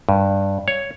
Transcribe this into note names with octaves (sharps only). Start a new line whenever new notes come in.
G2
C#5